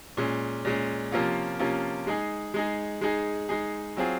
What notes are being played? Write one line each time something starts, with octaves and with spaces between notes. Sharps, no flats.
A#2 G#3 C#4
A#2 G#3 C#4
C3 F3 A#3 C#4 F4
C3 F3 A#3 C#4 F4
G#3 D#4 G#4
G#3 D#4 G#4
G#3 D#4 G#4
G#3 D#4 G#4
F#3 C4 F4 G#4